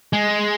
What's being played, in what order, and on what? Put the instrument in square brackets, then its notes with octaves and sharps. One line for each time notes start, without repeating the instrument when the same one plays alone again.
[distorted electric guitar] G#3